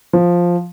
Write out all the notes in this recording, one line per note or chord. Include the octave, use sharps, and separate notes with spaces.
F3